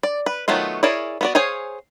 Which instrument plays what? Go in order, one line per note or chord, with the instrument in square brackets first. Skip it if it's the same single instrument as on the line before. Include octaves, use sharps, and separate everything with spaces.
[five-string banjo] D5
B4
D#3 F#3 A3 B3 F4
E4 G#4 A#4 C#5 D5
B3 F#4 D5
G#4 C5 C#5 F5 G#5